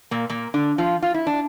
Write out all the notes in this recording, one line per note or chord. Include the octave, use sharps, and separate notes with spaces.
A#2 A#3
A#2 A#3
D3 D4
F3 F4
F4
E4
D4